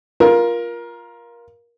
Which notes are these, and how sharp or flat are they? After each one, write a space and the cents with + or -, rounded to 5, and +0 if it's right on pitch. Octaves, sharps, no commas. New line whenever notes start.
F4 +0 A#4 +20